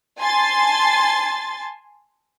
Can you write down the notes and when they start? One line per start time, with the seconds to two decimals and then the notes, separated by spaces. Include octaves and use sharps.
0.19 G#5 A5 C6 A6